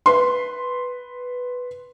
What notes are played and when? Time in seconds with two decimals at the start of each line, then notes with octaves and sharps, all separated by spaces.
0.06 B4 C6